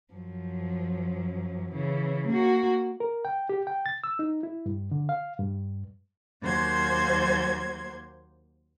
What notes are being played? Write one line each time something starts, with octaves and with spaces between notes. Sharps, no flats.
F#2 F3
C#3 E3
A#3 F#4
A#4
G5
G4
G5
A6
E6
D#4
E4
G2
D3
F5
G2
D#2 F#3 A#3 C5 C6 G#6